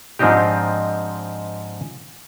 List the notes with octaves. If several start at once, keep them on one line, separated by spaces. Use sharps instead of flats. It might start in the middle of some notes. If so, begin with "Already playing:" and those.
G#2 F3 C4 D4 D#4 G4